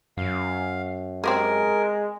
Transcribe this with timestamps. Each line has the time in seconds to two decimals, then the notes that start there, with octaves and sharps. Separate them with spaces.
0.17 F#2 F5
1.24 G#3 C4 G4 G#4 A#4